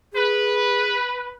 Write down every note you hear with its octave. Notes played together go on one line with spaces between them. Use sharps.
G#4 B4